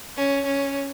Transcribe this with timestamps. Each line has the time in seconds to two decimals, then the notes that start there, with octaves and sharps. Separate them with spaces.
0.17 C#4
0.45 C#4